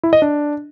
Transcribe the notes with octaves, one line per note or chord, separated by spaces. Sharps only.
E4
D#5
D4